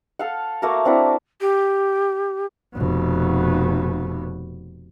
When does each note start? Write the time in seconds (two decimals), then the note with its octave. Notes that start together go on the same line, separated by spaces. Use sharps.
0.19 A4 F5 F#5
0.62 A3 A#3 F#4 A#4
0.85 C4 D4 E4 F#5
1.41 G4
2.75 F1 B2